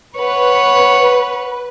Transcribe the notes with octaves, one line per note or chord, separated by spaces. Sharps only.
B4 C#5 F#5